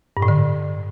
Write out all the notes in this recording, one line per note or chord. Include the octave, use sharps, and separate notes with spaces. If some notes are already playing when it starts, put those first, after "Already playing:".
G2
A2
D3